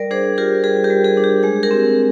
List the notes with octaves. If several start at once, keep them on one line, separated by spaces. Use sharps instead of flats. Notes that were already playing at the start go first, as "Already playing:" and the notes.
Already playing: G3 A#4 D5
D4 G#4 C5
F4 G4 A#4
G3 G#4
G4 A#4
G3
G#4
D4
G4
G#3 G#4
G4 A#4
C4